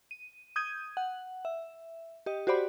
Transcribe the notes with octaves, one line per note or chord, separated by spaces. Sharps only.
D#7
D#6 G6 G#6 D#7
F#5
E5
G4 D#5
F#4 G4 C5 D5 B5